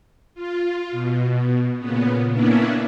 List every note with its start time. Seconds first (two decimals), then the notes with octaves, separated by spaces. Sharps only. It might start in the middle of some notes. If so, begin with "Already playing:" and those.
0.35 F4
0.92 B2
1.78 A#2 C#3 B3
2.32 A#3 B3 C#4 D4 E4